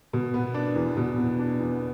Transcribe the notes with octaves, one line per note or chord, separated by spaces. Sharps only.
B2
B3
D4
E2
B2
B3
D4
E2